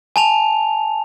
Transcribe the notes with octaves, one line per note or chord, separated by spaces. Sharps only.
G#5 A5 F7